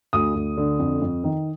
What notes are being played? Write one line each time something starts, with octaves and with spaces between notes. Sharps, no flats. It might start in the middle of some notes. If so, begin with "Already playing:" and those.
D2 D#6
D2
D3
F2
F2
D#3